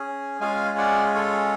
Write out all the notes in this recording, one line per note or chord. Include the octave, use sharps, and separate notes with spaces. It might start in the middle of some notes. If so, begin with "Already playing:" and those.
Already playing: C#4 G#4
G#3 C#4 F4 G#4 F5 G#5
D5 F#5
A4 C#5